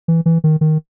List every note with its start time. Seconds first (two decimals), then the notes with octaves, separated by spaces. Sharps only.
0.08 E3
0.26 E3
0.44 D#3
0.61 D#3